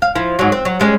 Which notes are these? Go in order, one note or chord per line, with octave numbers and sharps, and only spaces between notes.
F5
F3 E4
G#2 F#3
C4
F#3
G3 G#3 C#4